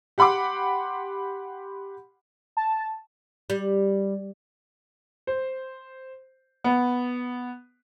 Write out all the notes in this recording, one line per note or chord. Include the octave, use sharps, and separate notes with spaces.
G4 F#5 B5 C6 D6
A5
G3
C5
B3